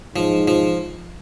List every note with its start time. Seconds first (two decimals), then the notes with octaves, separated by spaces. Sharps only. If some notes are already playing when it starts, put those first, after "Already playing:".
0.16 G#2 F3
0.48 F3